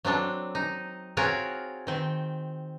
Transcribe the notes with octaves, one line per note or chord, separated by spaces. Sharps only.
F#3 C4 D4 A4
D#4
C4 F4 F#4 G#4 A#4 C#5
D#3 C4